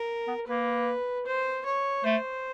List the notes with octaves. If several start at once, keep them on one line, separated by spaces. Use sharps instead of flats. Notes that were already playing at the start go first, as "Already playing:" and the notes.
Already playing: A#4
B3
A#3 B4
C5
C#5
A3 C5